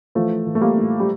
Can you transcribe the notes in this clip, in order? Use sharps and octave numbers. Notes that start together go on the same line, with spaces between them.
E3 F3 A3
E3
A3
G3 A#3
A2
G3